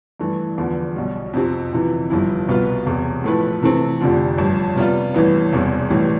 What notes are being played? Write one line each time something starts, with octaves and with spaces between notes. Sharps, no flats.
G2 E3 A3 E4
E2 D3 F3 B3
B1 B2 G3
F2 C3 F3 C4 G4
G1 F2 C3 E3
G1 G2 F3 B3 E4
C2 B2 B3 F4 B4
E1 E2 C3
A2 F3 A3 E4 B4
C3 E3 A3 C4
F1 F2 D3 F3
A1 G2 F3
C3 G3 B3 F4
A1 G2 E3 B3
E1 E2 C3 G3
A1 A2 E3 G3